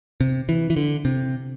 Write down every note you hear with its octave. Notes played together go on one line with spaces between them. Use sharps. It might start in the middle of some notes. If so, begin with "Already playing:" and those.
C3
E3
E3
D3
C3